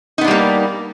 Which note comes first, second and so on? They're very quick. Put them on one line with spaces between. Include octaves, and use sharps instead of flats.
D#4 B3 D4 G3 A#3